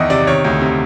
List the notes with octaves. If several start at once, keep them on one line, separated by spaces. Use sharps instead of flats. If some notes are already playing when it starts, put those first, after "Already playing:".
Already playing: E2 D#3 D#5 E5
C3 D5
D#3 C#5
D2
C3